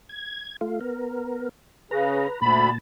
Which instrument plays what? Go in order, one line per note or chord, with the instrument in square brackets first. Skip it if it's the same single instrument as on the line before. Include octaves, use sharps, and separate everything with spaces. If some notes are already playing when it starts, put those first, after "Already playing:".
[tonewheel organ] G#6
A3 F4
B3 A#4
[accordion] C#3 [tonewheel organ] B4 A#5
[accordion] D2 B5 [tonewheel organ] A#2 A5